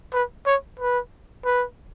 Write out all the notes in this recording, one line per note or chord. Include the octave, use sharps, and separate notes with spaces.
B4
C#5
B4
B4